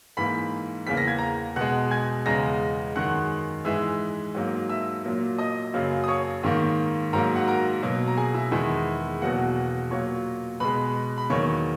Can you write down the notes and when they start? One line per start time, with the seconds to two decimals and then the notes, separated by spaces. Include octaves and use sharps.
0.17 G#2 E3 A#3 B5 B6
0.87 E2 C#3 E3 A#3 B6
0.97 A#6
1.08 G#6
1.18 A#5 A#6
1.56 B2 G#3 F#5 F#6
1.91 G#5 G#6
2.26 E2 C#3 G#3 A#5 A#6
2.96 F#2 D#3 G#3 F#5 F#6
3.65 G#2 E3 G#3 E5 E6
4.35 G#2 F#3 A#3
4.69 E5 E6
5.04 A#2 F#3 A#3
5.38 D#5 D#6
5.73 F#2 C#3 F#3 A#3
6.04 D#6
6.08 C#5 C#6
6.43 G#2 D#3 A#3
7.13 G#2 F#3 A#3 A#4 A#5
7.36 F#4 F#5
7.48 A#4 A#5
7.82 B2 F#3 A#3
8.08 A#5
8.17 G#4 G#5
8.34 E4 E5
8.52 E2 D#3 G#3 E4 E5
9.21 E2 B2 F#3 A#3 F#4 F#5
9.91 A#2 F#3 A#3 C#5 C#6
10.60 B2 G#3 B4 B5
11.18 B5
11.30 E2 D#3 F#3 A#3 C#5 C#6